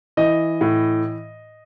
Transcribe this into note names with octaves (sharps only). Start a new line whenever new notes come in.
E3 D#5
A2